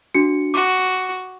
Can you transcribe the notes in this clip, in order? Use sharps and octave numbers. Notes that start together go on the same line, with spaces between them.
D4 F#4 C#7
F#4 D6